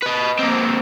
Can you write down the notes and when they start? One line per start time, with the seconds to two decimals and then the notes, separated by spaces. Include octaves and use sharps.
0.03 B4 D#5
0.39 A#3 C4